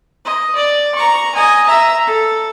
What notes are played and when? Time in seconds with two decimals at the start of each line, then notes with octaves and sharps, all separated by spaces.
0.25 D#5
0.55 D5
0.95 A#5 C#6
1.35 D#5 G#5
1.67 E5 A#5
2.07 A4